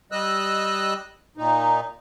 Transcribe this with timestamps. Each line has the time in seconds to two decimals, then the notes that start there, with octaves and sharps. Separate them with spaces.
0.12 G3 D#5 E6 F#6
1.37 A#2 D#4